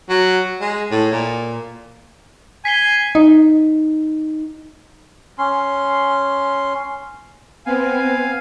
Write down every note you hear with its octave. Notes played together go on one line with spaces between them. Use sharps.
F#3
G#3
A2
A#2
G#5 B6 C7 G7
D#4
C#4 C6
B3 C4 F5 G#5